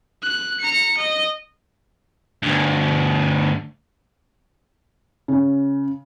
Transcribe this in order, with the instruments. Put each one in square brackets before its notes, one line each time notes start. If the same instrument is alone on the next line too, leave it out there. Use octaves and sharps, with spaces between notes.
[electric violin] F#6
A#5 C#7
D#5
[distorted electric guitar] D2 G2
[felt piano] C#3